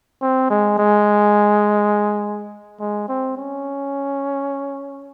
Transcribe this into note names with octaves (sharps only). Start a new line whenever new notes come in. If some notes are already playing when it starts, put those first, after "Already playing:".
C4
G#3
G#3
G#3
C4
C#4